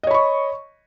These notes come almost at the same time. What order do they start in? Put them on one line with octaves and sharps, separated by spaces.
D#5 C#5 B5 C#6